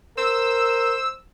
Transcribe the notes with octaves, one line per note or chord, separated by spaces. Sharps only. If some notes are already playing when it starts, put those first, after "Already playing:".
A#4 C5 E6